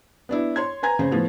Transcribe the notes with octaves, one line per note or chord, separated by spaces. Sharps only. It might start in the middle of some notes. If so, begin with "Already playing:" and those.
B3 D4 E4
C#5 C6 G#6
B4 G#5 A#5 G#6
C#3 C5
A2 F3 B3